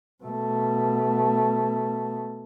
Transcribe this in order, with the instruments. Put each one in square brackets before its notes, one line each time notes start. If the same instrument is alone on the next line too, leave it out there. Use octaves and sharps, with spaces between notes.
[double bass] B2 A3